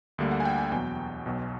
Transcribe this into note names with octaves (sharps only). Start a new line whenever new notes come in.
D2 D3 G3 A#3
F#5
G#5
G5
G#5
E2 B2 F#3 G5
B1 B2 F#3